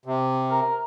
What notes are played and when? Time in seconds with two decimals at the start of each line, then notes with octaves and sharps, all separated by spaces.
0.06 C3
0.51 A#4